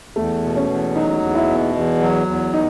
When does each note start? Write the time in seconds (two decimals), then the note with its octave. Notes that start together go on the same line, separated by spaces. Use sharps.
0.16 E2 A3
0.43 B2
0.56 C#4
0.69 E2
0.96 F#3 D#4
1.22 E2
1.35 E4
1.48 B2
1.75 E2
2.01 F#3
2.27 E2
2.54 B2 D#4